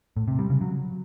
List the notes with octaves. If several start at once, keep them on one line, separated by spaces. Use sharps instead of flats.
A2
C3
G3
C#3
F#3